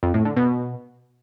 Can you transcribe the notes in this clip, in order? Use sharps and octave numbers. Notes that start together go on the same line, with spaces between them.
F2
A2
D3
B2